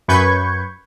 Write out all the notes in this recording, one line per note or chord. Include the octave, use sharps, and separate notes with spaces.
F#2 B4 C#6 G6 G#6